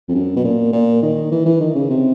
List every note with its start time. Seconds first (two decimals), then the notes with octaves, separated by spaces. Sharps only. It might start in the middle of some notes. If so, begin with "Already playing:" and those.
0.08 F2
0.15 F#2
0.36 B2
0.44 A#2
0.72 A#2
1.03 D#3
1.31 E3
1.46 E3
1.60 D#3
1.75 C#3
1.90 C3